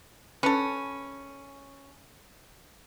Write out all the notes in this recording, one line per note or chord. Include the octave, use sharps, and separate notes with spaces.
C#4 A4 B4